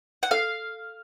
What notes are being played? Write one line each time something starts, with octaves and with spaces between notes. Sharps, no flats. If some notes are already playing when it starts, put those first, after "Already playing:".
F#5
A4 F5